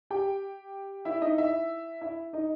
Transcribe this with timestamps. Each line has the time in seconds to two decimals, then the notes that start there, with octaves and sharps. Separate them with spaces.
0.10 G4 G5
1.05 E4 E5
1.22 D#4 D#5
1.38 E4 E5
2.01 E4 E5
2.33 D#4 D#5